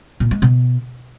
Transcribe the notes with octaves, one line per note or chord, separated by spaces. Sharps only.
A#2
G#3
B2